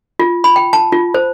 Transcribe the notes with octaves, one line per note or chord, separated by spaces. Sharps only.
F4
B5
G5
A5
F4
C5